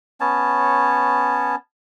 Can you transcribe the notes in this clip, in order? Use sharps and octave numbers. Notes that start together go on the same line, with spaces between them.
B3 C#4 C#5 A5